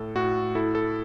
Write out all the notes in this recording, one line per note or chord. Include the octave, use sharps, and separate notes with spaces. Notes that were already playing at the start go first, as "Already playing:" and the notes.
Already playing: A2 A4
A2 F#4
E4 A4
A4